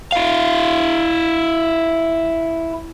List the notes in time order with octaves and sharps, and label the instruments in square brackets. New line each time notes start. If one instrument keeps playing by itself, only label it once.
[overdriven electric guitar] E4 F5